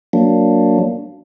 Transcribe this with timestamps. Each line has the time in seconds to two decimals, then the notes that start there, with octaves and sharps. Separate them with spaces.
0.13 F#3 A#3 D4